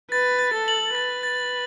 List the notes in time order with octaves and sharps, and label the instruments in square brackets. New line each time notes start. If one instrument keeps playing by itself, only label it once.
[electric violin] B4 [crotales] A6
[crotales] A6
[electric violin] A4
[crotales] F#7
[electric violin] B4 [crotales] A6
[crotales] A6